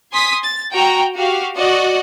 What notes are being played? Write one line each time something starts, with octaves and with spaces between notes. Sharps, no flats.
G#5 C6 D#6 B6
A6
F#4 G5 A#5
F#4 G4 F5
F#4 D5 D#5 F#5